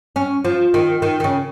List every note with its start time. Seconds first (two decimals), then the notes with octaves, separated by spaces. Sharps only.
0.16 C#4
0.44 F3
0.74 D#3
1.02 D#3
1.20 D#3
1.24 C#3